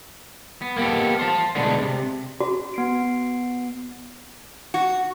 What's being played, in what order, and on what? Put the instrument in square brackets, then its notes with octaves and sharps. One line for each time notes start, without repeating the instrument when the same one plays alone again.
[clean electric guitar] B3
A#3 B3 F#4 G4 A4
C5 A5
B2 D3 G#3 A3 B3 D4
C3
[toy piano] F#4
[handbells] B3 C7 D7
[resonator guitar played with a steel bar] F#4